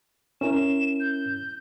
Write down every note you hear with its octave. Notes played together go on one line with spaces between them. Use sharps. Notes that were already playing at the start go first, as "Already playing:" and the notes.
C#4 E4 A#4 E7
G6